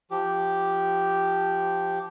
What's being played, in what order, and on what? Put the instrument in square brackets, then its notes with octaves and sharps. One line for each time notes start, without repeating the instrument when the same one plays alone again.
[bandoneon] F3 G4